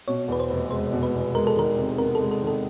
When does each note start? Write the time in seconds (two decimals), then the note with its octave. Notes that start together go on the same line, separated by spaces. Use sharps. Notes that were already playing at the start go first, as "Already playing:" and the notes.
0.08 B2 C#5
0.28 E2 B4
0.40 C5
0.50 F1
0.71 G#3 C5
0.92 B2
1.03 B4
1.14 E2
1.35 G#3 A#4
1.47 A4
1.56 D#3 A#4
1.77 C3
1.98 B3 A#4
2.15 A4
2.21 G#3
2.31 A4
2.42 D#3
2.47 A4